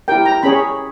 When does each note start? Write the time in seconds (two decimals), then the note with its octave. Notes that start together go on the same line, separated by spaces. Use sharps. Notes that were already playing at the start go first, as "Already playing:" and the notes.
0.08 E4 G4 A#4 G5
0.25 A#5
0.43 C#4 G#4 C#5 B5